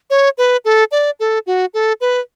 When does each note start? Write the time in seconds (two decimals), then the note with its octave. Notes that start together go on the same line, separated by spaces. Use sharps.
0.10 C#5
0.38 B4
0.65 A4
0.92 D5
1.20 A4
1.47 F#4
1.74 A4
2.01 B4